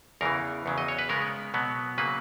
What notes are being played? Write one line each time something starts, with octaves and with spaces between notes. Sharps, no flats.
E2 C#3 E3 A#4
E2 C#3 F#3
D#5
C#5
B4
C#3 G#3 B3 A#4
B2 F#3 B3
C#3 F#3 A#3 B4